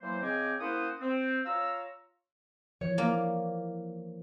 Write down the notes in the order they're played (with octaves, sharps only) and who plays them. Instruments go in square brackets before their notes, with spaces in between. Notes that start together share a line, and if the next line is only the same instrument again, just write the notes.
[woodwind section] E3 F#3 A#3 C5
C#3 C4 D#5 G5 G#5 D6
A#3 C#4 E4 F#4 C5 D#6
C4
F4 C#5 F5 A#5 E6
[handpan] E3 F3 [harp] C#5
[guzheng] A#3 D5